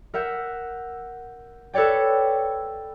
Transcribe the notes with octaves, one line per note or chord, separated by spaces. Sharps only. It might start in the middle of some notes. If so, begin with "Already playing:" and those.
A#4 E5 F#5 G6
A4 B4 C#5 D5 G5